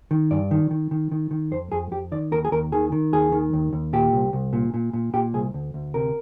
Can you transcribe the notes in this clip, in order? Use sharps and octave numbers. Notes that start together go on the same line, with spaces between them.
D#3
G2 D5
D#3
D#3
D#3
D#3
D#3
F2 C5
F2 G#4
F2 G4
D#3 D5
D#2 A#4
G#4
D#2 A#4
D#3 G#4
D#3
D#2 G#4
D#3
D#2
D#2
A#2 G4
C2
C2
A#2
A#2
A#2
A#2 G4
C2 G#4
D2
D2
C3 A#4